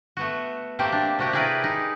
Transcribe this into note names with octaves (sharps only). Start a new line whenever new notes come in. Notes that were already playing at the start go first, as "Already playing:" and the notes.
A3 B3 F#4
A3 A#3 C4 G4
D4
C3 F#4 G4
E4 G4 G#4 A#4 B4 D5
D#4